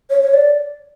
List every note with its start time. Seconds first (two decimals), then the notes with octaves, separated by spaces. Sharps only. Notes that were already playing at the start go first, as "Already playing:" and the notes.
0.10 C#5
0.22 C#5
0.34 D5